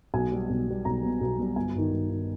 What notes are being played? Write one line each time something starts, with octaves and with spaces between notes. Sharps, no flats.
B1 G#5
B2 G3
B1
B2 G3
B1 A#5
B2 G3
B1
B2 G3
G1 G#5
G2 D#3
G1
D#3